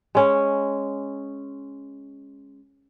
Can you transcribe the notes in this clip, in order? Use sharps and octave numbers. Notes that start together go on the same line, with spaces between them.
G#3 C#4 C#5